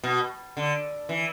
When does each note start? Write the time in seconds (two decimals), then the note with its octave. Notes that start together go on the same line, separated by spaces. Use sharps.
0.04 B2
0.57 D3
1.09 E3